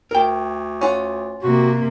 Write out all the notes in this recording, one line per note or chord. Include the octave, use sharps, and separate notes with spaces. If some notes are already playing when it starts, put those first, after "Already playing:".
D2 A#4 G5
C#4 F4 F#5
C3 A#3 F#4